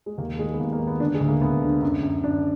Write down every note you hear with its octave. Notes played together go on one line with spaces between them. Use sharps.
G#3
D#2 A#3
D#3 G#3
B3
D#2 A#3
A#3
D#3
B3
D3 D4
G#3
D2
A#3
D2 B3
D3
F#2
F#2
F#2 D4